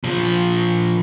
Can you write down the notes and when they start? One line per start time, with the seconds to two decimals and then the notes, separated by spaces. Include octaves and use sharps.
0.04 A#2 F3